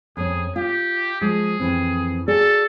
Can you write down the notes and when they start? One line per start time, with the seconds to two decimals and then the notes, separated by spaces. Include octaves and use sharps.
0.17 F2 C#4 G#4
0.56 F4 G4
1.21 F3 G#3 G#4
1.59 F2 E3 C4
2.28 F#4 G#4 A4 D5